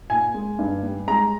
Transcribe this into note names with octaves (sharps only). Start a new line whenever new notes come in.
A#2 G#5
G#3
G2
G3
G#3 A#5